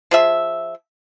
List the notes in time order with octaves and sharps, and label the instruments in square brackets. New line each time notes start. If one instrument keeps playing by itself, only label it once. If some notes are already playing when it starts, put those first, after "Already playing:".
[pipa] F3 G#4 E5